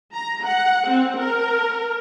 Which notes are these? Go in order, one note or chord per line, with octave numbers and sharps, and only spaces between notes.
A#5
F#5
C4
A#4